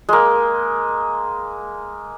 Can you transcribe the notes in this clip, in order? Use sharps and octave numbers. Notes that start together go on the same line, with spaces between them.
G#3 A#3